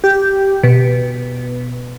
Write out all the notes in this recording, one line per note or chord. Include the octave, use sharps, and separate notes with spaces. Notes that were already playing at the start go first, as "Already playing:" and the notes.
G4
B2